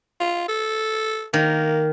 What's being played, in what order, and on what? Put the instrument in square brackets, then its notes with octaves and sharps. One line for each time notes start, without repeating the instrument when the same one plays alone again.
[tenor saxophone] F4
A4
[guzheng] D#3 [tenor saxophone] A#3